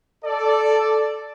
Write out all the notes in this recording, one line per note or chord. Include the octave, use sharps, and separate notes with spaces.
A4 D5